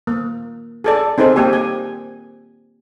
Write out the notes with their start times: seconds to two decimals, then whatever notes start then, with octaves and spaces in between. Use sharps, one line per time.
0.07 A#3
0.84 G#4 A4 D5
1.18 C4 D#4 G#4 A4 C5
1.36 A#3 G4 G#5
1.53 G#5